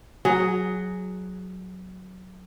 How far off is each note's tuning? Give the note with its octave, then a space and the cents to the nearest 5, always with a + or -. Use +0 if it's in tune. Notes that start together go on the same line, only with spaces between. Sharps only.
F#3 +0 G#4 +5